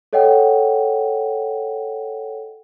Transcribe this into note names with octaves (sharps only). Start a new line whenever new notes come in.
A4 C#5 D#5 F#5 G5